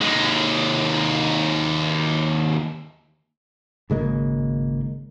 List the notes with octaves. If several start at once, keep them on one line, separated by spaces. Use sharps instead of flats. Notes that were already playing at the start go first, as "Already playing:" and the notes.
D#2 G#3
G#1 C#3 G#3 A#3